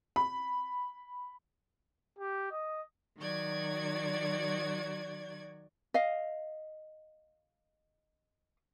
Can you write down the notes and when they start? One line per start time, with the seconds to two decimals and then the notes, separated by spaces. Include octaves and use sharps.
0.16 B5
2.19 G4
2.51 D#5
3.17 D#3 F#3 F#4 D5 G#6
5.94 D#5 F5